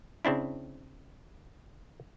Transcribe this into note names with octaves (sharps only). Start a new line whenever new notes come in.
C#3 C4 D4 E4